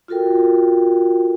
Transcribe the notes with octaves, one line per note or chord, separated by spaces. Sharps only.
F4 F#4 A4 A#4 G5